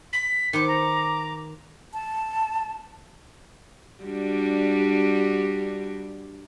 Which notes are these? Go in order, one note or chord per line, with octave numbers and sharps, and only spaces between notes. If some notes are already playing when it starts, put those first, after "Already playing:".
B6
D#3 B4 C5 D6 C#7
A#5
A5
G3 D4 F#4